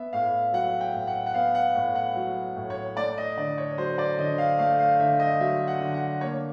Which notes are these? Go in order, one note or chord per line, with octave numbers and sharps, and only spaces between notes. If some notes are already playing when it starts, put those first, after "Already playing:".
Already playing: B3 E5
A2 F5
F#3 F#5
G5
A2
F#5
F#5
B3 F5
F#5
A2
F#5
F#3
A2
C#5
A3 D5
D#5
D3 D5
C#5
F#3 C5
D5
D3 D#5
F5
A3 F5
F5
D3 E5
D#5
F#3 E5
F#5
D3
F#5
A#3 C#5